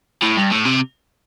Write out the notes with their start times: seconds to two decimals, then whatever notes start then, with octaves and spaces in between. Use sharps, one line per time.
0.22 A2
0.37 G2
0.51 A2
0.65 C3